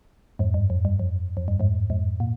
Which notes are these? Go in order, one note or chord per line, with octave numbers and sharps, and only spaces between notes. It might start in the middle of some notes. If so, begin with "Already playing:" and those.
F2 G#2
G2
F2
G2
F2
F2
G2
F2 G#2
F2 G#2
A#2